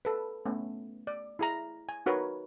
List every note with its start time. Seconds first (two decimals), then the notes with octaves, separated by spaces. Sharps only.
0.05 A4 B4
0.45 A3 B3 C#4
1.07 D5
1.39 E4 G#4 A#5
1.89 G#5
2.06 D#4 F#4 A#4 B4 C#5